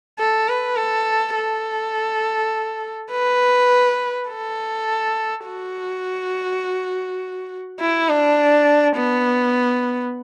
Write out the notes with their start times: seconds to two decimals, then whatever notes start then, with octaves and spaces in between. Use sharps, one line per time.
0.19 A4
0.48 B4
0.77 A4
1.36 A4
3.12 B4
4.29 A4
5.46 F#4
7.80 E4
8.09 D4
8.96 B3